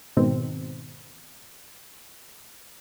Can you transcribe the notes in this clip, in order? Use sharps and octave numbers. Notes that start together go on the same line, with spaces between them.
G#2 B2 D#3 C4